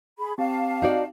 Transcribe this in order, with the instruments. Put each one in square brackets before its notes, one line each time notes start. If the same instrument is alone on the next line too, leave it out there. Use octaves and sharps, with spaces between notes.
[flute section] G#4 B5
[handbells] C4 G4 [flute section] F5 A5
[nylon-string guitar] D#4 F#4 D5